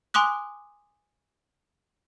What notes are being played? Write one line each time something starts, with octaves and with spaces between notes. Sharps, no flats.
G#5 C6 D6 D#6 F#6